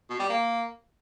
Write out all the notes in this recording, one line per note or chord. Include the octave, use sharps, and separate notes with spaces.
B2
G3
A#3